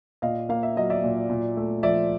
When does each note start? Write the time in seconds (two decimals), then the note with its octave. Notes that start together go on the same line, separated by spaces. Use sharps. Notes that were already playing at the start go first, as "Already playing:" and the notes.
0.22 A#2 D#5 F5
0.49 A#3 F5
0.63 E5
0.76 F#3 D#5
0.90 D5 E5
1.04 A#2
1.30 A#2
1.57 A3
1.83 F3 D5 E5